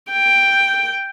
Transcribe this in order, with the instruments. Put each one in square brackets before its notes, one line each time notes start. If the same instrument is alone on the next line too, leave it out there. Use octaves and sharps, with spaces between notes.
[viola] G5